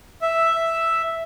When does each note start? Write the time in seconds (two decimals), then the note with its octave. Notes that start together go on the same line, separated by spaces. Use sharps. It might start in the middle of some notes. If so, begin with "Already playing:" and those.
0.22 E5